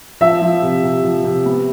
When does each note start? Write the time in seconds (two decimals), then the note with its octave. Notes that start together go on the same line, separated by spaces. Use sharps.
0.21 F3 E5
0.42 F3
0.62 C3
0.84 C3
1.04 F3
1.25 C3
1.46 B3